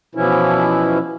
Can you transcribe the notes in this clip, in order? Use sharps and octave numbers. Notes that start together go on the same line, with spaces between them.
B2 E3 F3 C#4 E4